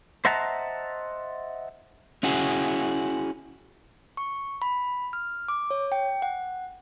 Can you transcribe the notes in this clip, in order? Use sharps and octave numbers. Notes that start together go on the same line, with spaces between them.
C5 D#5 E5 F#5 A5 A#5
C#4 E4 F#4 G#4
C#6
B5
F6
D6
C#5
G5
F#5